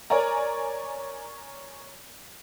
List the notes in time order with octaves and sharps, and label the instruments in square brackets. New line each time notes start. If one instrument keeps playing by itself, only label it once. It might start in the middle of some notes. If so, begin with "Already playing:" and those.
[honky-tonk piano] A#4 C#5 D5 G#5 A#5